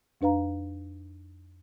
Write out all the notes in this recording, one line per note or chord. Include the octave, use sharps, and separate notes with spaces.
F2 D4 B4 F5 A#5